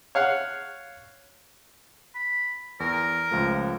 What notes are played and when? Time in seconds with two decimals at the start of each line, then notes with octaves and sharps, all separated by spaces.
0.15 C#5 F5 F#5
2.15 B5
2.80 E2 A#4
3.31 C#2 F3 A3